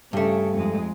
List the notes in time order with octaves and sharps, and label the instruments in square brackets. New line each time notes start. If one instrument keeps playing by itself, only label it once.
[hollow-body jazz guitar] G2 A3 [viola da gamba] C#3
[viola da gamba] F2 G#3